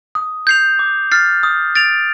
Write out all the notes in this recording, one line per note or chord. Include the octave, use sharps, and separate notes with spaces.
D#6
G6 C7 F7
D6
F6 A6 C7
D#6
A6 D7 F7